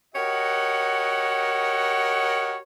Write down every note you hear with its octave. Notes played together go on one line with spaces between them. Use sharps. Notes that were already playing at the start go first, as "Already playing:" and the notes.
F#4 G4 A#4 C#5 D#5 F#5